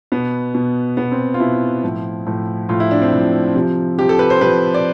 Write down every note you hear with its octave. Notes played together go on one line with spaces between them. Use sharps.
B2 B3
B2
B2 B3
C4
F4
B2 E4
A2 F3
A2 F3
A2 F3 F4
E4
D4
C4
A2 F3
C3 F3
C3 F3 G4
A4
B4
C5
C3 F3 B4
D5